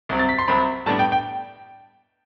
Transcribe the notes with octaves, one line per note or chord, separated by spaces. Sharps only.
C2 C3 F#3 C4
A6
B6
C6
C2 C3 F#3 C4 B5
A2 G3 B3 D4 A5
G5
G5